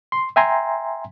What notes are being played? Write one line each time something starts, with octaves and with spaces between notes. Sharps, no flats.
C6
E5 G5 G#5 A#5 C6